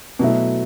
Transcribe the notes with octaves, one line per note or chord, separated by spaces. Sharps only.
B2 F#3 A3 E4